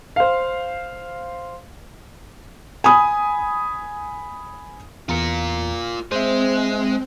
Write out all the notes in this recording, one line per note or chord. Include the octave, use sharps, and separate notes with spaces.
C5 F5
G#5 B5 D#6
E2 F4 A#4 A#5 C#7
G#3 C4 C5 E5